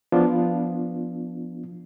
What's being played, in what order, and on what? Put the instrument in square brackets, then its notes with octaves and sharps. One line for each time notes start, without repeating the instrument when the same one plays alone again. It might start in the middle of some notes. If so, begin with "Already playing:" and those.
[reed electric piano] F3 B3 D4 F4